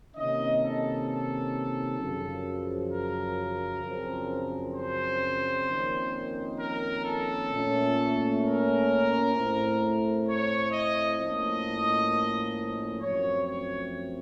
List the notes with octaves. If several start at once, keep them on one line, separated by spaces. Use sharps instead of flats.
C3 D#3 A#3 C#4 D#5
A4
A4
F#2 C#3 F3
A#4
F#2 C#3 F3 C4
C5
F2 D#3 A#3 C#4
A#4
A4
A#2 A3 C#4
A#4
A2 A3 C4
C#5
D#5
A2 F3 A#3 C#4 D#5
F#2 F3 A3 C4 C#5
C#5